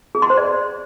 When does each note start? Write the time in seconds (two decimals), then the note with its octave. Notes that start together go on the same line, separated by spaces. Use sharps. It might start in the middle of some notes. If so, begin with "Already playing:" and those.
0.15 G#4
0.22 C6
0.30 C5
0.38 D5